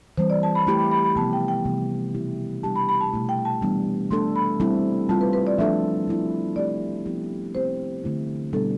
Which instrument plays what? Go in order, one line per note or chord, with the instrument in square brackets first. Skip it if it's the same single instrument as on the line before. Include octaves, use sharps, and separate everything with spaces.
[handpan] E3 G3 C4 [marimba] C5
[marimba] D5
A5
B5
[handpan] A3 E4 G4 [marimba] B5
[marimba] B5
B5
B5
[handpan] C3 F3 B3 [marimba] A5
[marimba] G5
G5
[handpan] C3 E3 G3 B3
B2 A3 E4 G4
[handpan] G3 D4 G4 [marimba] A5
[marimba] B5
B5
A5
[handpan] B2 A3 E4
[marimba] G5
A5
[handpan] E3 G3 B3 D4
[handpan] A3 D4 A4 [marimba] C6
[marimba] B5
[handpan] G3 C4 E4 A4
[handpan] G3 C4 F4 [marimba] A5
[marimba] B4
B4
D5
[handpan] F3 A3 D4 A4 [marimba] E5
[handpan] F3 C4 E4
[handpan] A3 C4 G4 [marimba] D5
[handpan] F3 B3 E4 G4
[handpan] A3 C4 G4 [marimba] C5
[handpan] D3 A3 E4
[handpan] B2 G3 B3 D4 [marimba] A4